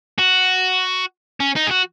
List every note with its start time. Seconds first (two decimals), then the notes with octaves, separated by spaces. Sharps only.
0.18 F#4
1.40 C#4
1.56 D#4
1.67 G#4
1.71 F#4